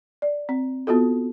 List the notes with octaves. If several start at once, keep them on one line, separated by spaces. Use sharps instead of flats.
D5
C4
B3 F4 F#4 A4